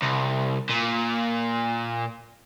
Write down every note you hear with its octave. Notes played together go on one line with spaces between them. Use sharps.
C2
A#2